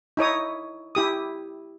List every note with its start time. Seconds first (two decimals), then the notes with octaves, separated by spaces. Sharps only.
0.17 D#4 E4 C#5 D#6
0.95 E4 G4 D#6